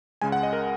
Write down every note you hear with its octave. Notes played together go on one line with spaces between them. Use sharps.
C#2 C#3 G#3 G#5
F#5
D#5
A#4